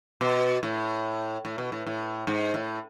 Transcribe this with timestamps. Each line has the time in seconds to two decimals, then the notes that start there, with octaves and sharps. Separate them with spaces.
0.21 B2
0.63 A2
1.45 A2
1.58 B2
1.72 A2
1.87 A2
2.27 G#2
2.54 A2